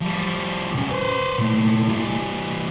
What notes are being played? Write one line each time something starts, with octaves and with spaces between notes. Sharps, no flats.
F3 G3
C2 C#4
B4 C5
A#2 A3
E3 G3